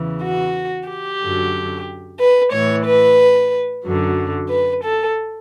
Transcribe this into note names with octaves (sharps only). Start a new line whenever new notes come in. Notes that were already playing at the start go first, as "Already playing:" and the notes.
Already playing: E2 C#3 E3
F#4
G4
F#2 D3 F#3
B4
A2 E3 C#5
B4
F#2 D3 F#3
B4
A4